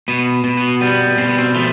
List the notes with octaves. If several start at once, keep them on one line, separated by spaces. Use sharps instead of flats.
B2 B3
B2
B3
G3 B3
B2 C4
B3
C4
F3 A3 F4